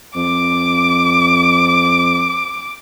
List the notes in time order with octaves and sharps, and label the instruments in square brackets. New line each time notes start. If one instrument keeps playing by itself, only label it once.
[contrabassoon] F2 [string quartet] D6